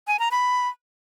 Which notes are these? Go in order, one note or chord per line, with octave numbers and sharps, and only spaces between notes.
G#5
A#5
B5